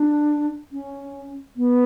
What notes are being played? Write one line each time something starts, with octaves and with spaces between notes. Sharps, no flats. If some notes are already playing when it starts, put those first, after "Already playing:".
Already playing: D4
C#4
B3